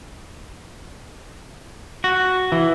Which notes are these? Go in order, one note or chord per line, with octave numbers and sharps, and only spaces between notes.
F#4
E3